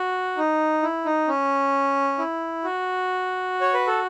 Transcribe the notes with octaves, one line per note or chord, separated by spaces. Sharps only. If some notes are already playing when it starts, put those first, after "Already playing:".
Already playing: F#4
D#4
E4
D#4
C#4
E4
F#4
C#5
B4
A4